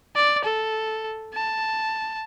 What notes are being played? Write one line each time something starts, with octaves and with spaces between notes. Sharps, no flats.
D5
A4
A5